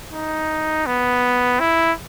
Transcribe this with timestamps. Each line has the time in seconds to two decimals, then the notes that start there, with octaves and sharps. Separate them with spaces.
0.13 D#4
0.86 B3
1.60 E4